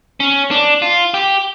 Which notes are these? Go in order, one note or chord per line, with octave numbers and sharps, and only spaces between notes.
C#4
D4
F4
G4